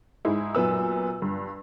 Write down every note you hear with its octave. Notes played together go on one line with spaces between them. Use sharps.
G#2 G#3 E4
F#2 A#2 B3 E6
G2